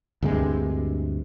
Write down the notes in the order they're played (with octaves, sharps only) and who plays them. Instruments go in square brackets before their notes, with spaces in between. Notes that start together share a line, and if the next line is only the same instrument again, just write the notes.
[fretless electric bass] D2 G2 C3 G#3